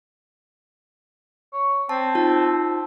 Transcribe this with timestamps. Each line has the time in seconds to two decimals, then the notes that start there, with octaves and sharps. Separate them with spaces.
1.53 C#5
1.89 C4 A5
2.15 D#4 F4 A5